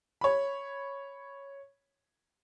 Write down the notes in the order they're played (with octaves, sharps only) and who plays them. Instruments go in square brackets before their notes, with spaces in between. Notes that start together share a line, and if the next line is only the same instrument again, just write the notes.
[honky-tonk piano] C#5 B5